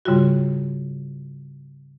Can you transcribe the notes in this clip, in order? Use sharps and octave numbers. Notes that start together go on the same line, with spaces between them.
G#2 C#3 G3 F4 F#4